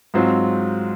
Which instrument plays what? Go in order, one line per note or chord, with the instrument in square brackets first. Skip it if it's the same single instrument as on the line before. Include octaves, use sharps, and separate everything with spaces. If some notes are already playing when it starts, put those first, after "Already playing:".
[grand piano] G#2 F#3 C4 F4